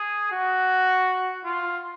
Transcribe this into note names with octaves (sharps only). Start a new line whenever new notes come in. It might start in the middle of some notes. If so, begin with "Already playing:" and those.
Already playing: G#4
F#4
F4